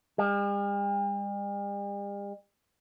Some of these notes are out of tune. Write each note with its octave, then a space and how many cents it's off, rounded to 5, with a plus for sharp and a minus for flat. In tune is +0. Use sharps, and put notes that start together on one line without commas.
G3 +45